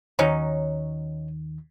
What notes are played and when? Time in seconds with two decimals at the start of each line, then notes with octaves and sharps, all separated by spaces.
0.19 D#2 D#3 F#3 C#4 D#4